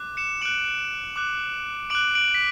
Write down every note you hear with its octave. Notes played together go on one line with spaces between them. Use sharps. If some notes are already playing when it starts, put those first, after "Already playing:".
Already playing: D6 F#6
C#7 E7
D6 F#6 D7 F#7
D6 F#6
D6 F#6 D7 F#7
D7 F#7
B6